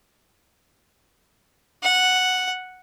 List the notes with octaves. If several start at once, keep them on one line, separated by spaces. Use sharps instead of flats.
F#5